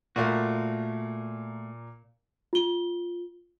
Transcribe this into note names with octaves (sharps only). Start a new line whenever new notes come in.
A#2 A3 F4 F#4 A#4 F5
F4 G7